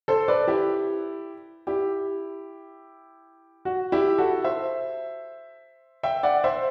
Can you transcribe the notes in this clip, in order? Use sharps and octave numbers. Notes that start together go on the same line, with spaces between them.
A4 C5
B4 D5
E4 G4
E4 G4
F#4
E4 G4
F#4 A4
C5 E5
E5 G5
D5 F#5
C5 E5